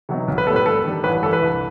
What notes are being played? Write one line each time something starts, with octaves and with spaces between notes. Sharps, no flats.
C3 F#3 B3 D#4
B1
B4
A2 G3 B3 A4
B4
G2 A4
D#3 G3
A1 B4
G2 E3 A4
B4
C2